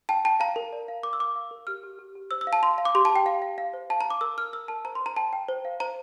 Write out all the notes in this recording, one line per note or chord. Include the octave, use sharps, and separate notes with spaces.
G5 A5
G5 A5
F5 A#5
A#4
D5
F5
A#4 D6
E6
F5 D6
F5
A#4
G4 F6
G4
G4
G4
C5 E6
E6
F5
A5
F5 C6
F5
D6
G4 C6
A5
G4
G5
F5
F5
F5
C5
F5 A5
A#5
F5 D6
A#4 E6
A#4 F6
A#4 E6
A#4 A5
C5 A#5
C6
C5 A#5
G5 A5
G5
C5
F5
C5 A#5